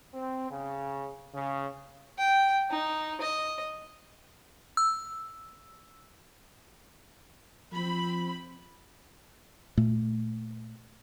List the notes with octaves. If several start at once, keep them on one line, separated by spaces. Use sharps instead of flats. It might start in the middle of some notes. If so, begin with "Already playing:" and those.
C4
C#3
C#3
G5
D#4
D#5
E6
F3 C4 B5
A#2 A3